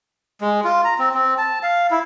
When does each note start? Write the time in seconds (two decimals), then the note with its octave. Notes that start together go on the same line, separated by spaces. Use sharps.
0.41 G#3
0.64 F4
0.84 A#5
0.99 C4
1.14 C4
1.38 A5
1.63 F5
1.91 E4